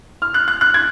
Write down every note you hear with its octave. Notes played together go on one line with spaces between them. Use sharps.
F6
F#6
F#6
F#6
G#6